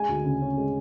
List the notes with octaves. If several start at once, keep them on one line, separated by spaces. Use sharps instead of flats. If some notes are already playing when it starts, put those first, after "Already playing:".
Already playing: G#3 G#5
D2
C#3
C#4
G#3